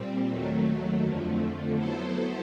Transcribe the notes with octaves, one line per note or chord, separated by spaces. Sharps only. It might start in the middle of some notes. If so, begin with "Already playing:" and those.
Already playing: A#2 G3 C4
D#2 D#3 F#3 A3
F2 D3 F3 A3
F#3 B3 E4 A4 C5